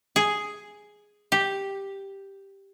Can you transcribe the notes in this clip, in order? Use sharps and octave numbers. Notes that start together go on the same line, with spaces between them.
G#4
G4